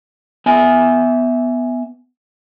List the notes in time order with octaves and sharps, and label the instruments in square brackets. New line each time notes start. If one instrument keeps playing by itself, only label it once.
[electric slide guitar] B3 E5 G#5